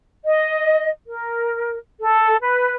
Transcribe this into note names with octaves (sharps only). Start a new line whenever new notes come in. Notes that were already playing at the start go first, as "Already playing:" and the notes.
D#5
A#4
A4
B4